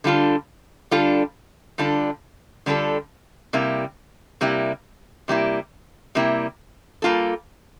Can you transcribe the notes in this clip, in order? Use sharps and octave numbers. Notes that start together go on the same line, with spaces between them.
D3 G3 D4 F4 A4
D3 G3 D4 F4 A4
D3 G3 D4 F4 A4
D3 G3 D4 F4 A4
C3 G3 A#3 E4
C3 G3 A#3 E4
C3 G3 A#3 E4
C3 G3 A#3 E4
G3 A#3 F4 A4